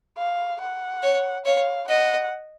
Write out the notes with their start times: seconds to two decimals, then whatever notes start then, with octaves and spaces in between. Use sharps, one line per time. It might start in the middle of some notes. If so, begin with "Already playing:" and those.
0.18 F5
0.61 F#5
1.03 C#5
1.45 C#5 F5
1.89 D#5 F#5